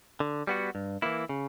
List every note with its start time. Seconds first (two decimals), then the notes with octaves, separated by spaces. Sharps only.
0.20 D3
0.47 G3 B3 F#4
0.75 G2
1.02 E3 A#3 E4
1.29 C#3